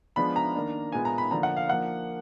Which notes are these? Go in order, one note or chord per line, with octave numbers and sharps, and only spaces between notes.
F3 G#3 B3 D4 B5
A#5
D#3 A#3 D4
A#2 G#3 B3 G#5
A#5
B5
D3 F3 A#3 D4 A#5
F#5
F5
F3 A#3 D4 F#5